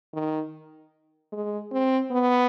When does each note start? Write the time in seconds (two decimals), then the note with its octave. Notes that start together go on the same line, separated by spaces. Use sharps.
0.14 D#3
1.32 G#3
1.72 C4
2.11 B3